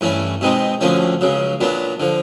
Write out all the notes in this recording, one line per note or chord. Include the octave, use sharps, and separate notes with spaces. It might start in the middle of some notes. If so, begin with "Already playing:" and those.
G2 E3 A3 C#4
B2 G#3 C4 D#4
D2 D3 F3 A3 C#4
C#2 C#3 F#3
A#2 F#3 B3 D4
D3 F3